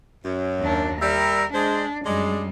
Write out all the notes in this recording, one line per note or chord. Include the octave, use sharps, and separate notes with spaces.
F#2
D#2 D4
G3 A#4 E5
G#3 D4 C5
F#2 G3 G#3 D4